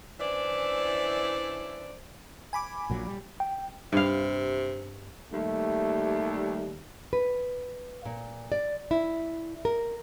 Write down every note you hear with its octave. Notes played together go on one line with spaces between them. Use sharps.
E3 C#4 D4 E4 C5 D5
G#5 B5 D6
A#1 A#2 F#3
G3
G5
G2 C3 F5
D#2 G3 A3
B4
A#2
D5
E4
A#4